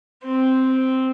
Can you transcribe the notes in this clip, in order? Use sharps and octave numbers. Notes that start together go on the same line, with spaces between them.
C4